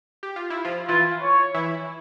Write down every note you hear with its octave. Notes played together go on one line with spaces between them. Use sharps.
G4
F4
E4
F3 F4
E3 E4 F4
C#5
E3 E4